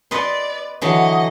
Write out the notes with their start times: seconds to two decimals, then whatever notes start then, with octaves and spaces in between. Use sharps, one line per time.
0.11 B4 D5 D#5 C6
0.81 D3 E3 F#3 D#5